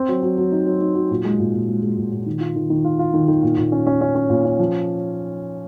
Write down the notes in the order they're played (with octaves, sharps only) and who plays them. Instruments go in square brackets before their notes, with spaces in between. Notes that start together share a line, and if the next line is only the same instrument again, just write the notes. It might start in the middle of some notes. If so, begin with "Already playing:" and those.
Already playing: [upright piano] C4
F#3
F#3
F#3
D#4
F#3
D#4
F#3
A#2
G#3
A#2
A#2
G#3
G#3
A#2
A#2
D#3
F4
D#3
D#3
F4
F4
D#3
D#3
A#2
A#2
C#4
C#4
C#4
C#4
A#2
C#4
F3